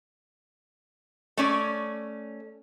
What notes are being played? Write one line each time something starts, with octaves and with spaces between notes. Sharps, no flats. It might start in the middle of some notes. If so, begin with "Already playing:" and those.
A3 C#4 D5